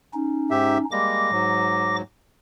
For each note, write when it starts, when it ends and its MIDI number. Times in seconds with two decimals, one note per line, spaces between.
0.14 0.85 61
0.14 0.85 63
0.51 0.78 44
0.51 0.78 67
0.51 0.78 76
0.91 1.31 55
0.91 1.31 56
0.91 1.31 58
0.91 1.96 86
0.91 1.96 94
1.31 2.02 44
1.31 2.02 54